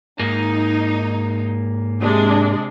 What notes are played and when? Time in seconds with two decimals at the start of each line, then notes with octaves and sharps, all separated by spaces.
0.19 G#2 A#3 D#4
2.01 C3 G#3 D4